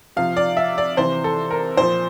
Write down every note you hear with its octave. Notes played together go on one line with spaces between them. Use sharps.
C3 F3 F5
D5
E5
D5
C3 E3 C5
A4
A#4
A#2 F3 C5